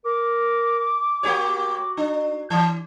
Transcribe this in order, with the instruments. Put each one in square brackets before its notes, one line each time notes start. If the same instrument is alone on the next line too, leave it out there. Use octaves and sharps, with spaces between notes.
[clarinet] A#4 [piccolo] D6
[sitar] A#3 G4 C#5 [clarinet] F#4
[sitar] D4
E3